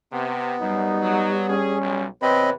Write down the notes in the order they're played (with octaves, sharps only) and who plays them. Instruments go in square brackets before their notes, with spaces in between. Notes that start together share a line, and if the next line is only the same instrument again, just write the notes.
[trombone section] C3 [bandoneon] B3
[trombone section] F#2 [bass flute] G3 [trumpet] D#4
[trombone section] F#3
[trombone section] G2 G#4 [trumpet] C#4
[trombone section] B1
[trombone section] E2 C3 [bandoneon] C4 D#5 B5 [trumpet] B4 [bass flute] C#5